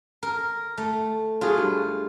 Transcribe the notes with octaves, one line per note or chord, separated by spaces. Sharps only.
A#4
A3
F#3 F4 F#4 G#4
G2